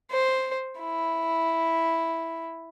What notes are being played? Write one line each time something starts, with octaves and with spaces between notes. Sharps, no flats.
C5
E4